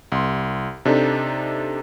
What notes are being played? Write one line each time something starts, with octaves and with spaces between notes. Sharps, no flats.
C2 C6
C3 D4 D#4 A4